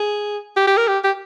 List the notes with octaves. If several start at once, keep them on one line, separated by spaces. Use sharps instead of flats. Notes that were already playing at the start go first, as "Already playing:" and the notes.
Already playing: G#4
G4
G4
A#4
G4
G4